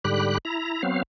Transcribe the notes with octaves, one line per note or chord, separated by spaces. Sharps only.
G#2 D3 G3 G4 B5 F#6
E4 A#5
F#3 B3 C4 F5